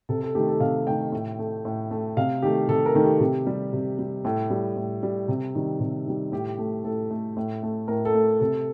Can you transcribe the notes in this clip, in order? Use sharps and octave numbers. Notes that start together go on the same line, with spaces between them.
C3 A4
A4
D#3 A3 G4
A4
C3 F5
D#3 A3 G5
A2
A3
A2
A3
C3 F5
D#3 A3 G4
C3 A4
A#4
D#3 A3
G4
C3
G3
C3
G3
A2 A4
G3
A2
G3
C3
D#3 G3
C3
D#3 G3
A2 G4
A3
A2 A4
A3
A2
A3
A2 A#4
A4
A3
C3 A4